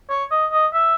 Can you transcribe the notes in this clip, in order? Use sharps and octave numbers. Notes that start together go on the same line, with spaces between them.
C#5
D#5
D#5
E5